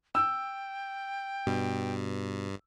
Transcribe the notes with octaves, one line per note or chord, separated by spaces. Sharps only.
G5 E6
G2 B2